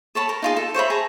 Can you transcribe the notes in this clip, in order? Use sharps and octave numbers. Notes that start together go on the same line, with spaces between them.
A4 C#5 A5 B5
A#4
D#4 F4 G#4
A4
C5 C#5 E5 B5
G#4 A5 A#5